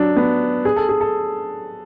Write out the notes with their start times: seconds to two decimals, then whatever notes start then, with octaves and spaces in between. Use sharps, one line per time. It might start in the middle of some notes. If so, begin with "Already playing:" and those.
Already playing: F#3 D4
0.17 B3
0.65 G#4
0.76 A4
0.89 G#4
1.01 A4